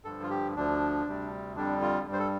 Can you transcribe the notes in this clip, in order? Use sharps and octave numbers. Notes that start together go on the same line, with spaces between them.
G2 D3 F3 A4
F4
G4
D2 D3 F3 D4
D2 C3 G3
F2 D3 G3 D4
F4
G2 G3
C5
A4